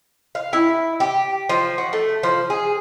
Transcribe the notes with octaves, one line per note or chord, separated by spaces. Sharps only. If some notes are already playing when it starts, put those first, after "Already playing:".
F5
E4
G4
F3
F#4
A3
F3
G#4